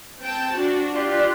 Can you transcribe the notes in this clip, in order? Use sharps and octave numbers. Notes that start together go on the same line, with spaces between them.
C4 G5 A5
D4 F#4
F4 G4 D5 C6 F#6